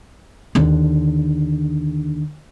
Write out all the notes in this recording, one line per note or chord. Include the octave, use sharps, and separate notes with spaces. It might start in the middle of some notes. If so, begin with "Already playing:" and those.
D#2 D3